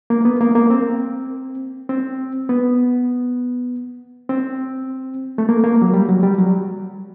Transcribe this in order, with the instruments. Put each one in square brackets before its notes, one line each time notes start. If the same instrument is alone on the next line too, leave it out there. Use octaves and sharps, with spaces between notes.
[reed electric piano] A#3
B3
A#3
A#3
C4
C4
B3
C4
A3
A#3
A#3
F#3
G3
F#3
G3
F#3